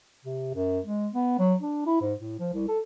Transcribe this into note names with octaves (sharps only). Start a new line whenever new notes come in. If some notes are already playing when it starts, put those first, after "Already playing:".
C3
F#2
G#3
B3
F#3
D4
E4
G#2
A2
F3
C2
A4